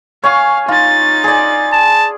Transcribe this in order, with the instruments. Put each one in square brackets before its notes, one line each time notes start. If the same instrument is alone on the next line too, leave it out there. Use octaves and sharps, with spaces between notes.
[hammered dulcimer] C#5 G#5 C#6 [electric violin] F5
[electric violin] D#4 A6 [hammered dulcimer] F4
[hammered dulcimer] G#4 D5
[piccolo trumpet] A5